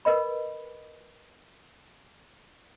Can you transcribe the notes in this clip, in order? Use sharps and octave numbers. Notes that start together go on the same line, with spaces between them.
A#4 B4 D#5 B5